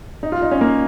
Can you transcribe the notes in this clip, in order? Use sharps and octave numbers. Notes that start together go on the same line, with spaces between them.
D#4
F4
D#4
C#4
A#3